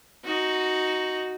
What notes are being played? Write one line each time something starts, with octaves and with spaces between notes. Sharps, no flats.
D#4 F#4